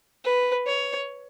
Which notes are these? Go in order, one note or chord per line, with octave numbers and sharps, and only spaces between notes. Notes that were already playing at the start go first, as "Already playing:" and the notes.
B4
C#5